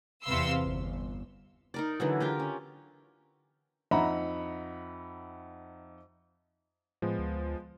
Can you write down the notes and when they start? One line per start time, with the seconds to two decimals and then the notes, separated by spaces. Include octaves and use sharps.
0.24 E2 C3 B4 F5 C6 E6
0.65 G1
1.74 D#4 A#4 D5
2.00 D3 E3 F#3
2.20 F4 G4 A#4
2.40 C#4
3.91 F2 D#4 E5 F#5 A#5 B5
7.02 A2 F3 G#3 B3
7.19 D2